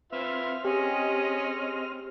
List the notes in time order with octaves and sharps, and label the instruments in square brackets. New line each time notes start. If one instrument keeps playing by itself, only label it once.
[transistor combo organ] C4 F6 [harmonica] F4 B4 E5
[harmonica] C#4 [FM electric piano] G4 [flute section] G#4 D#5